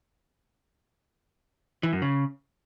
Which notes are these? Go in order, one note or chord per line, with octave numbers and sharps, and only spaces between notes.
E3
F#2
C#3